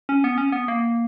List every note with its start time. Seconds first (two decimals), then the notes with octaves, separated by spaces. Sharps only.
0.09 C#4
0.24 B3
0.38 C#4
0.52 B3
0.68 A#3